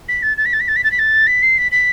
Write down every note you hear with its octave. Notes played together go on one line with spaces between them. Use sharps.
B6
A6
A6
B6
A6
B6
A6
B6
A6
B6
A6
B6
C7
B6
B6